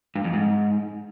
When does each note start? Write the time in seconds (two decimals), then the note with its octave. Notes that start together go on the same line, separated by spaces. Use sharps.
0.16 G2
0.24 F2
0.33 G#2